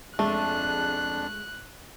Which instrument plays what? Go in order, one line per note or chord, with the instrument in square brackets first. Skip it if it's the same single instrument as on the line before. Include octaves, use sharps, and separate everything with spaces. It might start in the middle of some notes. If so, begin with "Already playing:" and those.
[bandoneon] F2 D4 [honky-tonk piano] G#3 [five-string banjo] A3 [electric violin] F#6